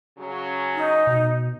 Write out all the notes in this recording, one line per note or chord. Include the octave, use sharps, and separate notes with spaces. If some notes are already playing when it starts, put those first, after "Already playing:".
C#3 F#3 C#4
D#4
B2